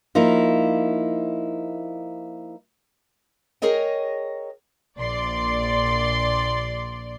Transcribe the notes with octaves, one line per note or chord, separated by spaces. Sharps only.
F3 A#3 D#4 E4
G#4 A#4 C#5 D#5 G5
A#1 D5 C6